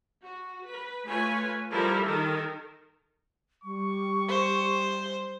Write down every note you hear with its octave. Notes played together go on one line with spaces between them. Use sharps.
F#4
B4
A3 F4 B4 C#5 G#5
F3 G3 E4 A4 A#4
D#3 A4 A#4
G3 C#6
C5